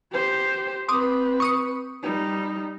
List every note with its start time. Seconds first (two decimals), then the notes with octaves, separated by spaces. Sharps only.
0.12 G4 C5
0.88 C4 B4 C6 D6 D#6
1.40 C#6 D#6 C#7
2.03 G3 D#4